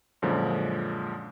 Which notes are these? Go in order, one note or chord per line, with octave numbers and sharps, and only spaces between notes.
F#2 A#2 D3 F3 G#3